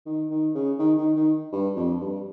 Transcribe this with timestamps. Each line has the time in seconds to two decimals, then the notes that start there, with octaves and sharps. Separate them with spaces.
0.06 D#3
0.30 D#3
0.55 C#3
0.79 D#3
0.98 D#3
1.16 D#3
1.52 G2
1.76 F2
2.01 G2